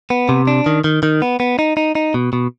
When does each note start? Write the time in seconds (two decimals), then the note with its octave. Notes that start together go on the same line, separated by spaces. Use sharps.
0.10 B3
0.29 C3
0.47 D4
0.66 D#3
0.84 D#3
1.03 D#3
1.22 B3
1.40 B3
1.59 D#4
1.77 D#4
1.95 D#4
2.14 B2
2.33 B2